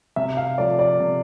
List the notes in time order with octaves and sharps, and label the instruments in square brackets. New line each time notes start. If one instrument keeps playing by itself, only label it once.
[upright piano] C3 [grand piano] E5
[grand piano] F5
[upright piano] F3 A3 [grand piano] D5
[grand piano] D5
[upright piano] C3